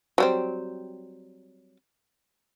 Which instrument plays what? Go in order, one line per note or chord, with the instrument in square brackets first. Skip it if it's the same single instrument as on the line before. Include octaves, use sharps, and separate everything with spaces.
[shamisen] F#3 G3 C4